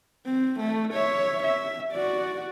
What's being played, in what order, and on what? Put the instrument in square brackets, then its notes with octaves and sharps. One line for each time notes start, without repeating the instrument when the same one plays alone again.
[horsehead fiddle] C4
A3
C#5 E5
E5
F#4 D5